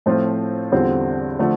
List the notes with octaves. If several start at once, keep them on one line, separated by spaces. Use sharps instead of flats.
A2 F3 A3 C4 F4
E2 D3 G3 C4 F4
D3 F3 A3